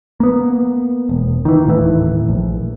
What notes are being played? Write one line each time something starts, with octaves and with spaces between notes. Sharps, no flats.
A#3 B3
E1
D#3 E3
D#1 A2 E3
A#1